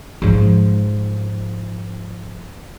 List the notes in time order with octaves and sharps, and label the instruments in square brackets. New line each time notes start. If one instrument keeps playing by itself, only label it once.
[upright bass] G#2 F3